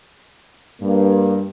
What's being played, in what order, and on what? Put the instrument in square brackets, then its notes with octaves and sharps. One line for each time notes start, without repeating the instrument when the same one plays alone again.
[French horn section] G2 [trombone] A#3